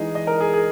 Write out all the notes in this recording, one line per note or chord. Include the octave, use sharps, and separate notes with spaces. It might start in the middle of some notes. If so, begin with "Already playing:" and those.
Already playing: E3 G#3 D#4 G#4
D#5
A#4
G#4
G#4